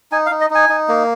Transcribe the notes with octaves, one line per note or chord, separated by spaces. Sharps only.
D#4 G#5
F5
D#4
D#5
D#4 G#5
D#4
A#3